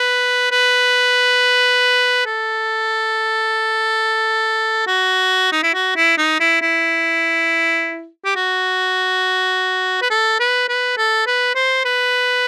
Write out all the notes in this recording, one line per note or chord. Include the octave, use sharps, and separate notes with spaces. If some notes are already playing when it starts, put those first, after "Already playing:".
Already playing: B4
B4
A4
F#4
D#4
E4
F#4
E4
D#4
E4
E4
G4
F#4
B4
A4
B4
B4
A4
B4
C5
B4